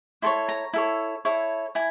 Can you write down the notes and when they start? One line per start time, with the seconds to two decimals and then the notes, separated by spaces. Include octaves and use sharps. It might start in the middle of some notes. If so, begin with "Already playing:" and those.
0.22 E4 A4 C#5 C6
0.49 A#5
0.73 E4 A4 C#5
1.25 E4 A4 C#5
1.75 E4 G#5